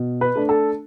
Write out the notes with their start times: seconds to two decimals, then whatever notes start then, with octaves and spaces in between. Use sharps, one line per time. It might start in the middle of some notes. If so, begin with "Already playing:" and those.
Already playing: B2
0.21 B4
0.35 A3 D4
0.49 A4